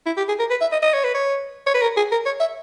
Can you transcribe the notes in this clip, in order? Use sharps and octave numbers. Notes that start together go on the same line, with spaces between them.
E4
G4
G#4
A#4
B4
E5
D#5
D#5
C#5
B4
C#5
C#5
B4
A#4
G#4
A#4
C#5
E5